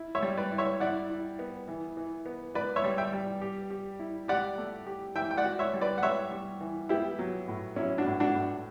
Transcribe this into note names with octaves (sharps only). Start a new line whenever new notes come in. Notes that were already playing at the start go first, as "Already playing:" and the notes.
Already playing: E4
C#5 E5
G3
B4 D5
E4
C#5 E5
E4 D5 F#5
E4
B3
E3
E3
B3
B3 B4 D5
C#5 E5
G3
E5 G5
G3
G4
G4
E4
G4 D5 F#5
A3
G4
E3 E5 G5
G5
D5 F#5
F#4
C#5 E5
G3
B4 D5
F#5
G3 C#5 E5
G3
E3
B3 E4 G4
F#3
A2
F#3 C#4 E4
D4 F#4
A2
D4 F#4
A2